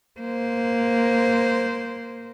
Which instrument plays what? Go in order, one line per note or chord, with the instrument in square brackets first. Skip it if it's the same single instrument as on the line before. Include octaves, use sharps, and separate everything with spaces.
[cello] A#3 C5